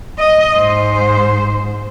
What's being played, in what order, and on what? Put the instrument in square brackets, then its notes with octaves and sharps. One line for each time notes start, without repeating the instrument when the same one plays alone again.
[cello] D#5
G#2 C5